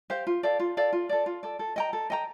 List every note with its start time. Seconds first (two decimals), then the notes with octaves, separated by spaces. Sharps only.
0.10 G4 C5 F5
0.27 F4
0.43 A4 D5 F5
0.60 F4
0.77 A4 D5 F5
0.93 F4
1.09 A4 D5
1.26 F4
1.43 A4 D5
1.59 A4
1.76 D#5 G5 A#5
1.93 A4
2.10 D#5 G5 A#5